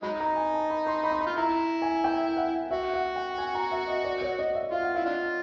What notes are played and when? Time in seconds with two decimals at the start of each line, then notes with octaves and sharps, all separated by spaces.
0.03 F#3 G#3 D#4 B5
0.20 A#5
0.36 G#5
0.54 A5
0.70 B5
0.87 C6
1.04 B5
1.12 C6
1.21 B5
1.27 F4
1.37 E4 A#5
1.82 G#5
2.04 G5
2.37 F#5
2.71 F#4 E5
2.93 F#5
3.16 G5
3.38 G#5
3.55 A#5
3.71 E5
3.88 D#5
4.04 D5
4.21 C#5
4.39 D#5
4.55 E5
4.71 F4 F5
4.83 F#5
4.95 E4 F5
5.06 D4 F4